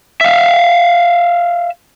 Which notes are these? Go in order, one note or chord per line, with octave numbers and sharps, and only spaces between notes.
E5 F5